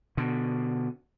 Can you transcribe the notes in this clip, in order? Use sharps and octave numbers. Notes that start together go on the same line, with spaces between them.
B2 D3